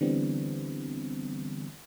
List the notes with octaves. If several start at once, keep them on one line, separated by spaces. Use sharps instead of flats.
D3 E3 G3 B3 C4